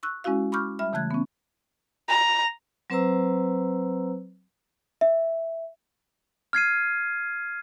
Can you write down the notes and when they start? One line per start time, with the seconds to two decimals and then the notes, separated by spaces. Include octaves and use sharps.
0.03 C#6 E6 F#6
0.24 G#3 C#4 E4 F#4 F5
0.52 B5 C#6 D6 F6 G6
0.79 G3 E5 B5 F6
0.93 C#3 E3 A3 F#6 G#6
1.11 B3 C#4
2.08 A#5
2.90 F#3 C4 B4 C5 A#5 E6
5.01 E5
6.53 F6 G#6 C7 D#7